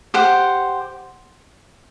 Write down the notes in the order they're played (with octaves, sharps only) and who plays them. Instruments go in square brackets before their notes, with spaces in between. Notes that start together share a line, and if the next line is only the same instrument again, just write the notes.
[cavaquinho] G4 C5 F#5